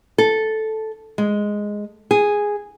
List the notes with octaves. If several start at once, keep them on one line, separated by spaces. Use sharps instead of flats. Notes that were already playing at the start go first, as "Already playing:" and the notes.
A4
G#3
G#4